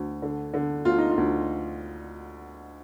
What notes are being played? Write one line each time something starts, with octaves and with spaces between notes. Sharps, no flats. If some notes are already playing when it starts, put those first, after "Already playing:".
Already playing: D2
D3
D3
D2 F4
D#4
F4
D2